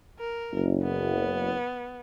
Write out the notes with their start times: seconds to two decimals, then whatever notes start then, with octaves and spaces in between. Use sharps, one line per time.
0.19 A#4
0.52 F#1
0.83 B3